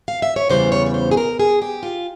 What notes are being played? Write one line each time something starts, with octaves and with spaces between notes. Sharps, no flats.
F5
E5
C#5
E2 C#3 E3 G3 C5
C#5
C#5
C5
G#4
A#4
G#4
G4
F4